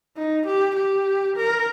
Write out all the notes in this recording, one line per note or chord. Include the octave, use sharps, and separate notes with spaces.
D#4
G4
G4
A#4